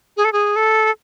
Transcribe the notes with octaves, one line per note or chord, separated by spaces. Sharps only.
G#4
A4
G#4
A4